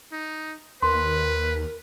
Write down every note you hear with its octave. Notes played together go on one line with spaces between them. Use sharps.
D#4
D#2 A#4 B4 C6